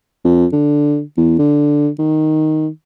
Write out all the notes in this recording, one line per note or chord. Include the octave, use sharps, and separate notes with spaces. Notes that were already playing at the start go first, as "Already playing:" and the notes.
F2
D3
E2
D3
D#3